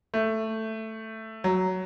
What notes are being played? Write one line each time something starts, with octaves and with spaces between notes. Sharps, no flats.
A3
F#3